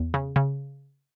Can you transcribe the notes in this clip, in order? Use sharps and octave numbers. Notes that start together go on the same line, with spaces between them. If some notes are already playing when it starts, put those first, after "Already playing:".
Already playing: E2
C#3
C#3